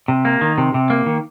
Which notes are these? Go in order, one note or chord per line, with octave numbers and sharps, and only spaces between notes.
C3
A#3
D#3
C3
C3
A#3
D#3